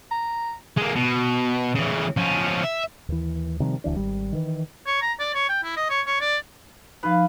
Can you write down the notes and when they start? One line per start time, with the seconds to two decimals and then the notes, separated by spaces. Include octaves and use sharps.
0.11 A#5
0.77 G#3 A#3
0.95 B2
1.75 C#3 E3
2.17 F3 C#4
2.63 E5
3.08 D#2 E3
3.60 C3 D#3 F3 G3
3.84 D1 D2 E3 D4
3.96 G#1 G3
4.33 D#3 E3
4.87 C#5
5.02 A#5
5.19 D5
5.34 C#5
5.49 G5
5.64 E4
5.77 D#5
5.90 C#5
6.07 C#5
6.21 D5
7.03 F3 D#4 B4 F5